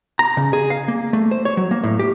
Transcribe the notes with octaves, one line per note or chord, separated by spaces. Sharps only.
A#5
C#3
G#4
F5
A#3
A3
C5
C#5
F#3
A#3
A2
G4